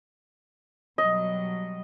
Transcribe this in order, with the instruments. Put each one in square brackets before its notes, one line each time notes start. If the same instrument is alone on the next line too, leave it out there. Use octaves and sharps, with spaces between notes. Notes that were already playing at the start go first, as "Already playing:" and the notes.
[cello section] B2 F#3 G3 [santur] D#5